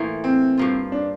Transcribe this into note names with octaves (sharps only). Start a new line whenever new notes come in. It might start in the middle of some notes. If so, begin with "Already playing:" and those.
Already playing: A2 E3 A#3 F4
C4
G2 F3 A#3 F4
D4